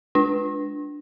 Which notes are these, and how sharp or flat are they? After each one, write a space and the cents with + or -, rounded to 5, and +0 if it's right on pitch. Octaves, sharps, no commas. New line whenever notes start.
G#3 +15 D4 +0